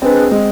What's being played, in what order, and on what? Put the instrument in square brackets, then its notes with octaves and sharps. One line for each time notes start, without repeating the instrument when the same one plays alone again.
[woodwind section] G#3 D4 G#4 B4 [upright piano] C4
[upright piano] G#3